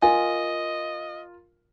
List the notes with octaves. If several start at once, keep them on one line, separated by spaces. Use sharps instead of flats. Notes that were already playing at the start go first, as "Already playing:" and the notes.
F4 A#4 D#5 G#5